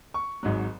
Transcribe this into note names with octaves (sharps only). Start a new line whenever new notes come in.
C#6
G#1 G#2 F#3